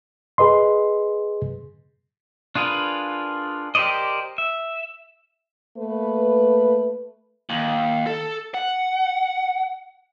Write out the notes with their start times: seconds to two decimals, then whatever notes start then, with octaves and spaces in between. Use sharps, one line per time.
0.38 G#4 B4 D#5 C6
2.55 D4 F4 G#4 A#4 B4
3.75 G4 A#4 C5 D5 D#5
4.38 E5
5.78 A3 A#3 B4
7.50 D#2
8.07 A4
8.54 F#5